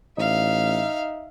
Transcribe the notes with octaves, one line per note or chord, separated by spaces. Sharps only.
A1 D#4 E5 F5